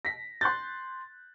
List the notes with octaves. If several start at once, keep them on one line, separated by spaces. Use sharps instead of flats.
A#6 B6
C6 F#6 G6 A6